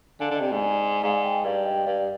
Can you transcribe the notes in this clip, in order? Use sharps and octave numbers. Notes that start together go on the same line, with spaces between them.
D3 F5 G#5
D3 D#5
C3 D5
G#2
D5
G#2 D5 F5
D#5 G5
G2 D5 F5
D#5 G5
G2 D5 F5